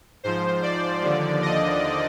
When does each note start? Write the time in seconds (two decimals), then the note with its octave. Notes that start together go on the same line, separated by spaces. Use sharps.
0.24 G#2 F3 C5
0.63 D5
1.02 D#2 D3 F3
1.42 D#5